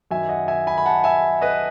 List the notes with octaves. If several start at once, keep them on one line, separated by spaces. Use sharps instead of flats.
F#2 D#3 F#3 E5 G#5
D#5 F#5
E5 G#5
G#5 B5
B5
F#5 A5
E5 G#5
B4 D#5